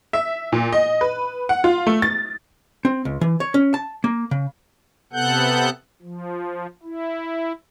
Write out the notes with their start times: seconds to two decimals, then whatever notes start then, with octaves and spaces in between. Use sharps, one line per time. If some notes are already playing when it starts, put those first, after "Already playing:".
0.13 E5
0.52 A#2
0.72 D#5
1.01 B4
1.49 F#5
1.64 F4
1.87 A3
2.02 A6
2.85 C4
3.05 C#2
3.21 E3
3.40 C#5
3.54 C#4
3.74 A5
4.04 A#3
4.31 C#3
5.13 C3 B3 A4 F#5 F#6 G6
6.02 F3
6.83 E4